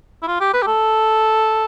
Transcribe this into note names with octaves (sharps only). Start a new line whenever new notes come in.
E4
F4
G4
B4
G4
A4